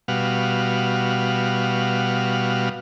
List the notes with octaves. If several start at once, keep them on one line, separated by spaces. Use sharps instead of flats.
B2 G3 F#4 F5